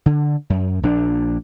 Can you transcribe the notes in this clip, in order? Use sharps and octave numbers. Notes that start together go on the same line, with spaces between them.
D3
F#2
A#1 D4